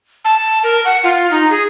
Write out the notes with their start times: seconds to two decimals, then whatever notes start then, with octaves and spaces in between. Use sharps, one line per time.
0.25 A5
0.64 A#4
0.85 F#5
1.04 F4
1.31 D#4
1.50 G#4